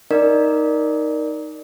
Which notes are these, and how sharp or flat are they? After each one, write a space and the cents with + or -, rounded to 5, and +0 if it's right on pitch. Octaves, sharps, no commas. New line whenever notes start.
D#4 +0 A#4 +0 D5 +0